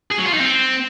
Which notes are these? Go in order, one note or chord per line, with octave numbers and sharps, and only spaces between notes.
G#4
F#3
F4
D#4
C4